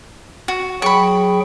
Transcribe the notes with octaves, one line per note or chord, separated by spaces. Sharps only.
F#4
F#3 G#4 G5 B5 C#6